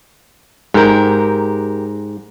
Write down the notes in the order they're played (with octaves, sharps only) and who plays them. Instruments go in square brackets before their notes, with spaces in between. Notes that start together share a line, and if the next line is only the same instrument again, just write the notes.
[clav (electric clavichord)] G#2 [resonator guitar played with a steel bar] G4 A#4